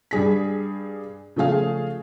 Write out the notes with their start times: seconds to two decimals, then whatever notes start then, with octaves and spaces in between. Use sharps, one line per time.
0.11 G2 G3 G#4 B6
1.36 C#3 F3 A3 G#4 F5